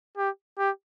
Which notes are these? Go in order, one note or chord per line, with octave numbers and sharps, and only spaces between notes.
G4
G4